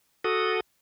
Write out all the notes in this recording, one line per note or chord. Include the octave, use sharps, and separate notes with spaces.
F#4 A4 D#6